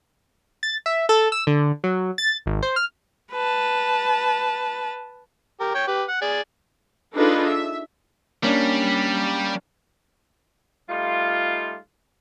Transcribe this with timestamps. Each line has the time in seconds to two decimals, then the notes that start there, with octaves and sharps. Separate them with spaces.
0.63 A6
0.86 E5
1.09 A4
1.32 E6
1.47 D3
1.84 F#3
2.18 A6
2.46 G#1
2.62 C5
2.76 F6
3.32 B4 A5
5.60 G4 A#4
5.74 C#5 G5
5.87 G4 B4
6.08 F#5
6.22 G#4 D5
7.14 D4 D#4 F4 G#4 A4 B4
7.47 E5
8.43 G3 A#3 C#4 D4
10.90 G3 A3 D#4 F4